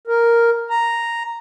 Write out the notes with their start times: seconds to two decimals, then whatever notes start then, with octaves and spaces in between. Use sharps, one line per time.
0.07 A#4
0.70 A#5